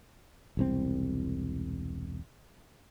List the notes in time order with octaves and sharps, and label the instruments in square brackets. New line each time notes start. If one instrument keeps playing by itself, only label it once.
[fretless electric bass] E1 C2 C4